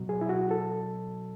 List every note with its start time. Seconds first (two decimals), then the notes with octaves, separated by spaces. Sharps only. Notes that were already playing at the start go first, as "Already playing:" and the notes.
Already playing: B2 F#3
0.09 G#4
0.21 E4
0.29 F#4
0.51 A4